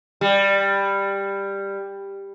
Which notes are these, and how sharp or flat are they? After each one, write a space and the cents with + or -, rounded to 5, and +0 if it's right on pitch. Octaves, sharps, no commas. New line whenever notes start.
G3 +10